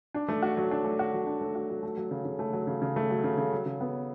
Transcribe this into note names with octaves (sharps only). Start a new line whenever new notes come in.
D4
A3
F#4
F#3
D4
A3
F#4
F#3
D4
A3
F#4
F#3
A3
F#3
C#3
C#3
A3
F#3
C#3
C#3
A3
F#3
C#3
C#3
F#3
C#3
B3